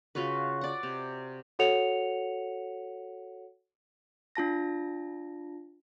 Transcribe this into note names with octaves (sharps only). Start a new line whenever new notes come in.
C#3 F4 F#4 B4
D5 F#5
C3
F#4 A4 C#5 F#5 C#7 F7
D4 F4 A5 A#6